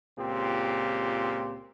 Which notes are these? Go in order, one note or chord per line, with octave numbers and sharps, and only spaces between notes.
C#2 A#2 C4 G4